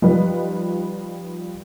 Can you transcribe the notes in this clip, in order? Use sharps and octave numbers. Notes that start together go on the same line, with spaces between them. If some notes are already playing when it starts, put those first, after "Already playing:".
F3 G3 D#4 B4